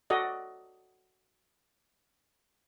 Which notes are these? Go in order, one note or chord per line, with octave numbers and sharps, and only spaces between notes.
F#4 A4 D5 D#5